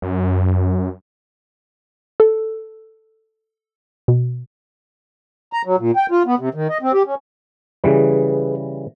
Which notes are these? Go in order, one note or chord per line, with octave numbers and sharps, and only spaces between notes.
F#2
A4
B2
A#5
F#3
A#2
G5
F4
B3
C3
D#3
D#5
C4
G4
C#4
C#3 E3 G3 G#4 B4